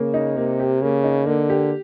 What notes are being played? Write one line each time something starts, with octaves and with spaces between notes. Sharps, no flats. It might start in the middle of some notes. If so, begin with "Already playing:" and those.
Already playing: C#3 A#3
D#4
C3 A#3
G4
C#3 A#3
D#4
D3 A#3
G4